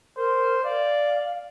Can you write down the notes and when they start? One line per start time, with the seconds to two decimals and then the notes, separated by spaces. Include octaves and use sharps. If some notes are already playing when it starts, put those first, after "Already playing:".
0.17 A#4 C5
0.64 D5 F5